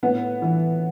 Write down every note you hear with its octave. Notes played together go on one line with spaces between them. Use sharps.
A2 B3
E3